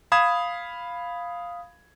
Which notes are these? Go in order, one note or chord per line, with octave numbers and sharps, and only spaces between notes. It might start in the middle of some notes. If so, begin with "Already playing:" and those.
F5 B5 D#6 G#6 E7